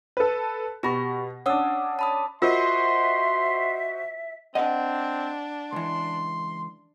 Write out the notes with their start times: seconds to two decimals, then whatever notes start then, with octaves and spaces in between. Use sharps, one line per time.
0.17 A4 B4
0.83 B2 G4 B5 C#6 A#6
1.46 C#4 D4 F#5 D#6 E6
1.99 A5 B5 D#6
2.42 F4 F#4 A#4 C5 D#5 E5 C6
4.55 C4 D4 D#5 F#5
5.73 C#2 E3 C6